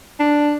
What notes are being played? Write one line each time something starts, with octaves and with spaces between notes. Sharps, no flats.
D4